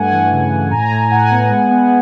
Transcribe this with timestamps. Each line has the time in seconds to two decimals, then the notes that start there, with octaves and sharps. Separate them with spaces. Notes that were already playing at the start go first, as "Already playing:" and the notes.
Already playing: G2 A3 F#5 G#5
0.11 E3
0.32 C#3
0.52 E3
0.71 A2 G#5 A#5
0.91 A2
1.10 A2 F#5 G#5
1.31 B3
1.50 G#3
1.70 B3